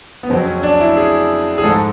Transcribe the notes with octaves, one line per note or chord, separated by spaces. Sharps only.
B3
F2 C#3 F#3 C4
C#4
D4
E4
G#4
G#4
G#2 F3 G#3 A4